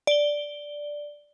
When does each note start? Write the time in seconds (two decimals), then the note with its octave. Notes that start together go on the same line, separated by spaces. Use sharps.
0.07 D5 G7